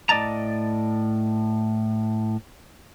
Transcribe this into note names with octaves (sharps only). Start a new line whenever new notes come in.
A2 D5 D#5 A5 A#5